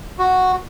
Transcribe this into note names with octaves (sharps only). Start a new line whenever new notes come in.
F#4